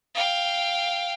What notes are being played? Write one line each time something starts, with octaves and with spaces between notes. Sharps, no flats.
F5 G5